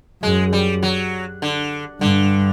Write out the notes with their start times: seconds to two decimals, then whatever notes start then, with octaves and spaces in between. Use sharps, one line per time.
0.23 F#2 G#3
0.53 G3
0.83 F#3
1.42 D3
2.01 G2 D3